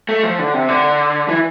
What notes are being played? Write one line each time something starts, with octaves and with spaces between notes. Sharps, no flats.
A3
F3
D3
C3
D3
E3